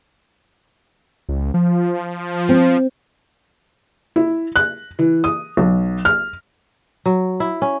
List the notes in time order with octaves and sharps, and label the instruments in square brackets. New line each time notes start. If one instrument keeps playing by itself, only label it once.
[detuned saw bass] C#2
F3
[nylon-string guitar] C4
[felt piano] E4
F#6
E3
D#6
B1
F6
[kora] F#3
E4
C#4